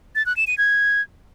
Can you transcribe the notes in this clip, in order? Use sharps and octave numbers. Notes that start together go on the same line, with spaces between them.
A6
F#6
E7
D#7
G#6